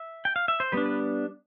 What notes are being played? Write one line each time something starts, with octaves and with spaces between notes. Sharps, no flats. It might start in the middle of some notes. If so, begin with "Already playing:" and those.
Already playing: E5
G5
F5
E5
C5
G3 B3 D4 B4
B4